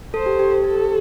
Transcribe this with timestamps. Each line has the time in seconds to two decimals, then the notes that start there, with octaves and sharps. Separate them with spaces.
0.14 A4 C5
0.26 G4
0.39 G4
0.51 A4
0.63 G4 A4 C5